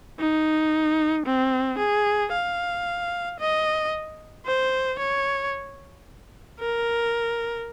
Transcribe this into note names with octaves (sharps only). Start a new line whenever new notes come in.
D#4
C4
G#4
F5
D#5
C5
C#5
A#4